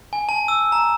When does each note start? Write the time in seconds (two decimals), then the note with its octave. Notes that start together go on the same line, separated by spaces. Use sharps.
0.13 G#5
0.29 A5
0.48 E6
0.72 A#5